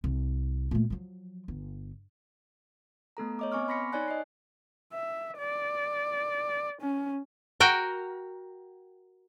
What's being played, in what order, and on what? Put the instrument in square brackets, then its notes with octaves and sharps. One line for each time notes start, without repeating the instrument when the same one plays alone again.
[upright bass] C2
A#2 A3
F3 F#3
G1
[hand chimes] A3 B3 A4 A#5
C#5 D#5 D6
B3 C4 G#5 C#6 D6 F6
B5 C6 A#6 B6 C#7
D#4 C#5 D5 G#5 F#6
D#5 C7
[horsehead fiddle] E5
D5
C#4
[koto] F#4 A#4 G5